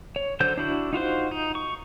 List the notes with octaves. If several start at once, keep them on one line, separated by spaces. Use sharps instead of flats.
C#5
D3 F#3 C5 G6
D4 E4 F#4
D#4 F4 F#4 C5
D#4
C#6